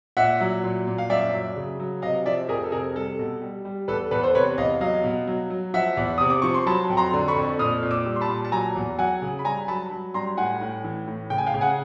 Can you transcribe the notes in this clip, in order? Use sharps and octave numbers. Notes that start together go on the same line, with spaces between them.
A#2 E5 F#5
F#3
A#2
A#2
F5
F#2 D5 E5
F#3
C#3
F#3
C3 D#5 F5
F3 D5 E5
F2 G#4 A#4
A4
C3 G#4 A#4
G3 A4
B2
G3
G3
E2 A4 B4
E2 A4 B4
C5
C3 B4 C#5
E2 D#5 F5
F#3 D#5 F5
B2
F#3
F#3
F3 E5 F#5
E2
C3 D#6
D6
F3 C#6
C6
F#3 A5 B5
F2
A#5 C6
D3
B5 C#6
F2
A#2 D#6 F6
A#2
D6 E6
G3
C6
A5 B5
A#2
A5
F#3 G#5 A#5
E2
F#3 F#5 G#5
C#3
B5
G2 G#5 A#5
F#3 A5 B5
F#3
G2 A#5 C6
A2 F#5 G#5
A2
E3
A2
C#3 G5
G#5
F5 G5
C#3
F#5 G#5